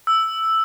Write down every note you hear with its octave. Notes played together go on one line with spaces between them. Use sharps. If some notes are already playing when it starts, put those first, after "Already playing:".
E6